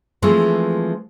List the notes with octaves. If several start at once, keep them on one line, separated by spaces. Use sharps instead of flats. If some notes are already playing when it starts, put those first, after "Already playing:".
E3 F3 G#3 A3 C4